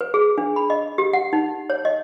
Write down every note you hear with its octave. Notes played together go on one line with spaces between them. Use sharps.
B4
G#4
D4
B5
D#5
G4
F#5
D#4
C#5
D#5